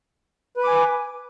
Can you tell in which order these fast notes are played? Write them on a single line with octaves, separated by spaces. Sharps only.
B4 B5 D6 G#5